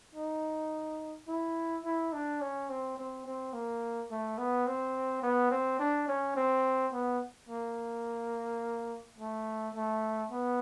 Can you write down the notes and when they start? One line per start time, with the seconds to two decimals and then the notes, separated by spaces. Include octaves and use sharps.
0.15 D#4
1.28 E4
1.84 E4
2.13 D4
2.41 C#4
2.69 C4
2.98 C4
3.26 C4
3.53 A#3
4.11 A3
4.38 B3
4.67 C4
5.22 B3
5.51 C4
5.79 D4
6.08 C#4
6.36 C4
6.93 B3
7.49 A#3
9.18 A3
9.75 A3
10.31 B3